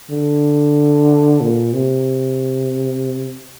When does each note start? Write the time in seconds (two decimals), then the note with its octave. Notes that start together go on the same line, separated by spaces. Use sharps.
0.10 D3
1.41 A#2
1.74 C3